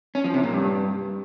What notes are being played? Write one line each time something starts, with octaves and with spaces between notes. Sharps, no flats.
C#4
F3
C3
A#2
G2